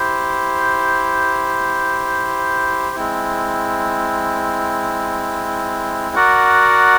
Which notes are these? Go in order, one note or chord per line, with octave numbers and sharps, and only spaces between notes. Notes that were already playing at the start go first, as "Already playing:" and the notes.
Already playing: E4 G4 C5
G#3 C4 E4
F#4 A#4 D5 F#5